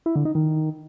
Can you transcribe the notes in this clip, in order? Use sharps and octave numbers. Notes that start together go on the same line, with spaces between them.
E4
D3
D#4
D#3